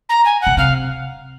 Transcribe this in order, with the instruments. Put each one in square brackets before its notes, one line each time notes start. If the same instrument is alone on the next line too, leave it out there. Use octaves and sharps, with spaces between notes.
[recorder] A#5
G#5
F#5
[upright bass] B2
[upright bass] C3 [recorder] F5